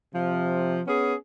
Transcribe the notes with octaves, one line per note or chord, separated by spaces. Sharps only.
C3 F3
B3 C#4 G#4